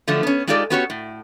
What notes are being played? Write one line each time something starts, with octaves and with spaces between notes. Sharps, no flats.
D3 F3 F#3 A3
B3 C#4
G#3 D#4 F4 G4 A4 D5
B3 C#4 F#4 G4 B4 C#5
A2